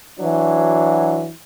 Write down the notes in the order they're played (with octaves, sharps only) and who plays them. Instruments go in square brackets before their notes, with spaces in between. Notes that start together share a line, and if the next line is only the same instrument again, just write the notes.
[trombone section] E3 F#3 D4 F#4